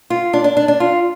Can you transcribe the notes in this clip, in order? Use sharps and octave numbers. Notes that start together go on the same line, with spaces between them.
F4
D4
D4
D4
D4
F4